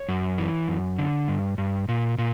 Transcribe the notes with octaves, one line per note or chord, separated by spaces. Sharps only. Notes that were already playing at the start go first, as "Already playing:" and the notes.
Already playing: C#5
F#2
E3
F#2
D3
G2
G2
A#2
A#2